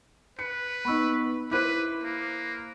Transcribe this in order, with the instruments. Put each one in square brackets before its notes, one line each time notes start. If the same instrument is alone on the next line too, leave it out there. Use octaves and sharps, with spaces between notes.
[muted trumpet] B4 [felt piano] C#7
[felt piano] B3 D#4 [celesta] B5 C#6 E6
[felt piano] E4 C5 [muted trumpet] B4 [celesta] D6 F#6 D#7
[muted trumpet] A#3